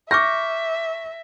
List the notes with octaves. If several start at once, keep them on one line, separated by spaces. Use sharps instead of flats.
E5 C#6 D6 F6 G6 A#6